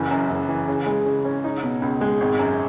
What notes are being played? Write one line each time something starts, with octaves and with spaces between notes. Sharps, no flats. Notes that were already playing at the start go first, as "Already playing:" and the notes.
Already playing: F#1 E3
F#2
F#1
E3
C#3
G#3
C#3
C#4
D#4
B2
C#2
G#3
G#1
F#2